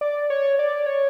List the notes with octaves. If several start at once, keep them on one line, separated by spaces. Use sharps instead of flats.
D5
C#5
D5
C#5